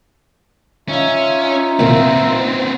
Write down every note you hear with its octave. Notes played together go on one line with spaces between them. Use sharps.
C#4 D#4 F4 E5
C2 A#2 B3 C4